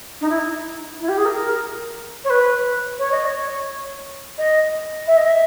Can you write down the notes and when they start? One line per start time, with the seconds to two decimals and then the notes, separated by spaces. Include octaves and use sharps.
0.21 D#4
0.29 E4
0.38 D#4
1.00 E4
1.08 G4
1.17 G#4
1.25 A#4
2.24 C#5
2.29 B4
2.98 C#5
3.11 D#5
3.25 C#5
4.38 D#5
5.07 E5
5.16 D#5
5.26 E5